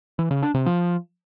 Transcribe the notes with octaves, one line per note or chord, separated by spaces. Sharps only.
E3
C#3
D4
C3
F3